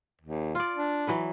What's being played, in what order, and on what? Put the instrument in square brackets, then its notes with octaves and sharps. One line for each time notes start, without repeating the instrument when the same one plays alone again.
[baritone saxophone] D#2
[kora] F4 D5
[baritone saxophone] D4
[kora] E3 F#3 B4